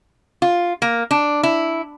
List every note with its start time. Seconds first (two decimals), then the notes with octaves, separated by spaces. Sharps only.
0.42 F4
0.82 A#3
1.11 D4
1.43 E4